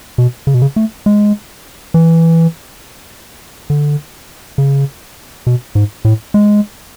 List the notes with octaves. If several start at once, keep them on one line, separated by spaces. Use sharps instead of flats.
B2
C#3
B2
C#3
A3
G#3
E3
D3
C#3
B2
G#2
A2
G#3